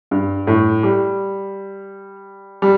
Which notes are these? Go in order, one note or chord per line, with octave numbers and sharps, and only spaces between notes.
G2
A2
G3
G3